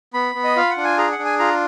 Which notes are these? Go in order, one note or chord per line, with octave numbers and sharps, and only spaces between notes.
B3 B5
B3
D#5
F4 F5
F#5
D4
G#5
G#4 A#5
F#5
D4
G#5
F4 A#5